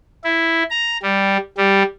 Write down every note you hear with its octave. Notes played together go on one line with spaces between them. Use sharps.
E4
A#5
G3
G3